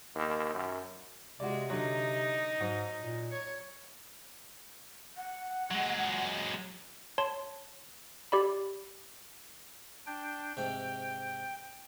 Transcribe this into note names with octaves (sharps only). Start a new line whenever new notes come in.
D#2
F#2
C3 G#3 F#4 D5
D3 F#3 D#4
G#2 F#3
A#2
C#5
F#5
F#3 G#3
C#5 A5 C6
G4 D5 B5
D4 G5
G#2 C3 G5